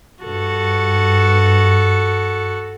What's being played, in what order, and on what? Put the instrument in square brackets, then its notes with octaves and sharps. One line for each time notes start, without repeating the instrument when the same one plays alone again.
[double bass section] G2 [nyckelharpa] F#4 A4